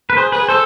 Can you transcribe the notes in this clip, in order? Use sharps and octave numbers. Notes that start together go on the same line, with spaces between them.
B4
G#4 C5
G#4 B4
A4 C5